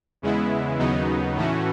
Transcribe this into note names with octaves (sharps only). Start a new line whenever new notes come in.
E2 C#3 G#3 B3 E4
D#2 C#3 F#3 B3 D#4
A2 E3 A3 C#4 F#4